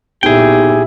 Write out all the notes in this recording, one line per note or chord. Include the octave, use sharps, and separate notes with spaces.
B1 A#2 E4 G4 G#4 G5